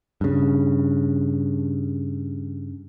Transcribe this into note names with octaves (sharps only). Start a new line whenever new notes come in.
G2 C#3